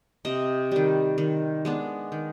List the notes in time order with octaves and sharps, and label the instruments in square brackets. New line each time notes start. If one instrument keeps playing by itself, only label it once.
[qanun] C3 D#5
D#3 G3
D#3
G#3 B3 D4
D#3